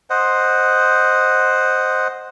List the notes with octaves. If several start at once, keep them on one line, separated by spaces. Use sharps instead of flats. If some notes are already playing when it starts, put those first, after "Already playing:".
C5 D#5 F#5